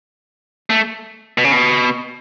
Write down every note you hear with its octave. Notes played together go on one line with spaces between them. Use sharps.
A3
B2
C#3
B2